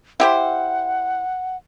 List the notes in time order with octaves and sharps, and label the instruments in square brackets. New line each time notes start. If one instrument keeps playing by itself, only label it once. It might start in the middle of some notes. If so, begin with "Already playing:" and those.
[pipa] E4 G4 C5 [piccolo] F#5